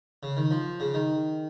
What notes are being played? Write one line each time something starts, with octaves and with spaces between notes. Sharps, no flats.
C#3
D#3
F3
C#3
D#3